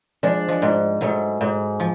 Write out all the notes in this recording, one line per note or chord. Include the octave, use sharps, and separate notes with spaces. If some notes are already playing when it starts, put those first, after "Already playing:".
F3 G#3 D4
F3 G#3
G#2
G#2 F#3 A3
G#2
F3